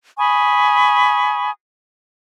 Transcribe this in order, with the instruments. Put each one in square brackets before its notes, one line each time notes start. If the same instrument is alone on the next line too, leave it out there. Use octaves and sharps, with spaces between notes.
[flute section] G#5 B5 C#6 D#6